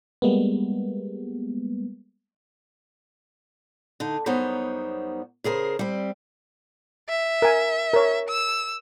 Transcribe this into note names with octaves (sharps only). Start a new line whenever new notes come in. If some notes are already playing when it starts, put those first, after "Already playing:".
G3 G#3 A#3 B3
D3 D#4
F#2 G3 B3 D#4 C5 C#5
C#3 G#4 A#4 C5
G3 C4
E5
A#4 G#5
A#4 C#5
E6